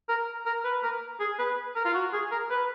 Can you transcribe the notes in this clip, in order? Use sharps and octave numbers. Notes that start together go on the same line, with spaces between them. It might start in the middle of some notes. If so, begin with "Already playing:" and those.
A#4
A#4
B4
A#4
G#4
B4
A#4
F4
F#4
G#4
A#4
B4